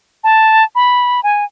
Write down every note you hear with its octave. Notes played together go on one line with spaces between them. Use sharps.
A5
B5
G#5